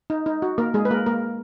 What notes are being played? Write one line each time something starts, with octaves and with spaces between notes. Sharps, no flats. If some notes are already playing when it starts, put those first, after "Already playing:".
D#4
D#4
F#4
A#3 A#4
G#3 G#4
B4
A#3 A#4
A#3 A#4